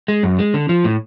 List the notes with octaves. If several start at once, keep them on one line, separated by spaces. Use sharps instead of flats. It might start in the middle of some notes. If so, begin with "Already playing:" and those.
G#3
F#2
G#3
D3
F3
A2